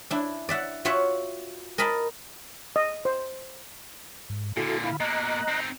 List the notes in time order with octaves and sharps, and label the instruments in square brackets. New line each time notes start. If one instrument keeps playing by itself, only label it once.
[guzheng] D4 E4
D5 E5 F#5
F4 F#4 C#5 E5 F#5
A#4 D#5 A5 B5
[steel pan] D#5
C5
[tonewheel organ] G#2
[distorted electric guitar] A#2 D3 [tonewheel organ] E4 F#4 A4
[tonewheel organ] E4 F5 B5
[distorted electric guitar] B2 A#3 [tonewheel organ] D#5 A#5 F#6
[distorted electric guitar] C4 D#4